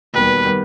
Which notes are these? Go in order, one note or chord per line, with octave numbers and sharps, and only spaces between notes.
E1 D#2 D#3 G3 B3 B4
D#3 G3 B3